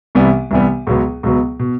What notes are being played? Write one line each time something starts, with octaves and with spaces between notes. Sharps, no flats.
C2 C3 E3 G3 B3
C2 C3 E3 G3 B3
C#2 B2 F#3 B3
C#2 B2 F#3 B3
B2